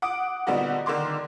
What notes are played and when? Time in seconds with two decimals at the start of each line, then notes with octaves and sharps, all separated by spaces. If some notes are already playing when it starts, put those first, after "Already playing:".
0.02 F#5 D6 D#6 D7
0.47 A#2 D3 G3 B3 D#4 F#4
0.86 D3 D#3 A#3 C6 D6